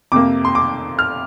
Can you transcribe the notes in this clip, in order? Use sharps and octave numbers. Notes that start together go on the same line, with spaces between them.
F2 C3 A#3 D6
C6
D6
F6